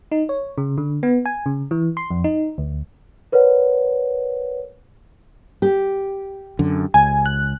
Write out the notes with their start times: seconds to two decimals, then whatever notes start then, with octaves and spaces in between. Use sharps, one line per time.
0.12 D#4
0.29 C#5
0.58 C#3
0.78 D3
1.03 B3
1.25 G#5
1.46 C#3
1.71 E3
1.97 C6
2.11 F2
2.24 D#4
2.58 D2
3.32 A#4 B4 C#5 D5 F#5
5.62 G4
6.59 F#2 D3
6.94 C#2 G#5
7.26 F#6